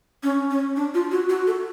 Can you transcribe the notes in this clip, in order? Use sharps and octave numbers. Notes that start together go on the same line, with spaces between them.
C#4
C#4
D4
F4
F#4
F#4
A4